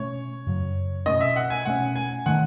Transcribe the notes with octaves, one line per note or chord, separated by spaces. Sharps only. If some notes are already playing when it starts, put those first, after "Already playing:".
Already playing: B2 A3 C#4 C#5
F#2 C#3 F#3
B2 A3 C#4 D#5
E5
F#5
G#5
B2 A3 C#4 F#5
G#5
D#3 A3 F#5